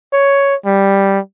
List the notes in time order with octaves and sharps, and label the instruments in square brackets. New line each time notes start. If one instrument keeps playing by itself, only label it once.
[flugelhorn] C#5
G3